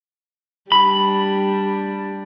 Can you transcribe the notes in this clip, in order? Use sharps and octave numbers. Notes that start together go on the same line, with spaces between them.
G3 D4 B5